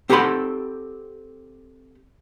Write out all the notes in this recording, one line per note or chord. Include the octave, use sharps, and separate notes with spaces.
C4 G4 A4 F#5 B5 C6